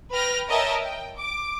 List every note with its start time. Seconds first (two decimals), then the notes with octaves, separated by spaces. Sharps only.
0.12 B4 G5 F6 A#6
0.49 A#4 C#5 D#5 E5 G5 A5
0.82 G5
1.19 D6